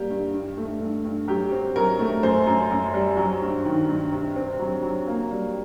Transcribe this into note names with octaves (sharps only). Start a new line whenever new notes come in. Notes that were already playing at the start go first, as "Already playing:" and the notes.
Already playing: G3 A#3 G4
G2
G2
A3
G2
G2
F#3 G4
C4
F#3 A#4
A3
F#2 C5
F#2
F#2
G3
F#3
G2
D#3
G2
C3
C4
F#3
F#3
A#3
G3